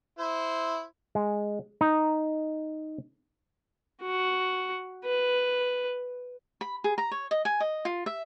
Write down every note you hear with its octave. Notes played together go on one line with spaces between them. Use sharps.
E4 C5
G#3
D#4
F#4
B4
B5
G#4
A#5
C#5
D#5
G#5
D#5
F4
E5